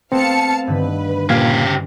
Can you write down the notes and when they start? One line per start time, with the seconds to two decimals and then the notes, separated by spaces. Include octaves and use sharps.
0.12 A3 B3 C4 F5 A5 C7 C#7
0.67 G2 D3 D#3 B4
1.30 A#2 C#3 G4 F5 G#6